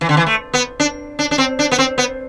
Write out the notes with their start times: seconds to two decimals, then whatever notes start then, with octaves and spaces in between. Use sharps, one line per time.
0.01 E3
0.09 D3
0.17 E3
0.26 A3
0.54 B3
0.80 D4
1.19 D4
1.31 D4
1.38 C4
1.59 D4
1.72 B3
1.78 C4
1.98 B3